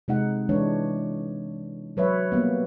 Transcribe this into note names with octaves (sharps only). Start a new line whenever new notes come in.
C3 G#3 D#4 F#5
E3 G#3 D4 C#5
F#3 B4 C#5 E5
G3 A#3 B3